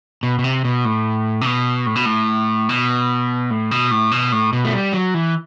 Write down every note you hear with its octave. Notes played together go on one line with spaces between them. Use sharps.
B2
B2
C3
B2
A2
C3
B2
A2
B2
A2
B2
A2
B2
A2
B2
A2
B2
A3
G3
F#3
E3